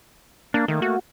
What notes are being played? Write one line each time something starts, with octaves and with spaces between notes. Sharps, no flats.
A#3 D4
D#3 A3 A#3
F#4